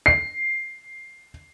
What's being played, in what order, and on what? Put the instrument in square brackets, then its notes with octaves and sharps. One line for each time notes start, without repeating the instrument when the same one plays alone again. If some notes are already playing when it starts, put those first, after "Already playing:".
[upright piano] C7